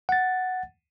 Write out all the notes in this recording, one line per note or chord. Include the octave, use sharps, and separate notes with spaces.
F#5 A6